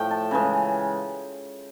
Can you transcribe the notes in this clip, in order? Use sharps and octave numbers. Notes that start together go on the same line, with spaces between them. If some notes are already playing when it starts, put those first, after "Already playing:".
Already playing: A2 F3 A3 G5
A5
C#3 E3 G#3